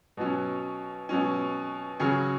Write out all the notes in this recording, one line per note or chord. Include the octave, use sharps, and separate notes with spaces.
B2 F#3 C#4
B2 F#3 C#4
C#3 F#3 C#4 G#4